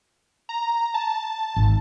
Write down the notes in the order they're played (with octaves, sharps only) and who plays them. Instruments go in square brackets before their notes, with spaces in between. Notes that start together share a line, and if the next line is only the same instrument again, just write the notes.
[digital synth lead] A#5
A5
[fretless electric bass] G#1